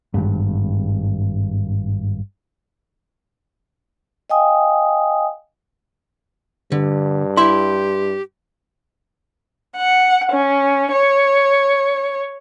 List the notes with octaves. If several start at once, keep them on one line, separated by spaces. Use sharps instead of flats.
G#1 G2
D#5 F5 G5 G#5 D#6
G2 D3
E4 G4 E5 C6
F#5
C#4
C#5